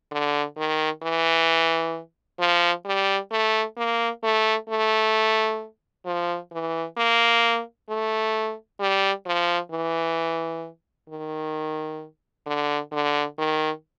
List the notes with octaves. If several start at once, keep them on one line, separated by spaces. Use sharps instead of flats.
D3
D#3
E3
F3
G3
A3
A#3
A3
A3
F3
E3
A#3
A3
G3
F3
E3
D#3
D3
D3
D#3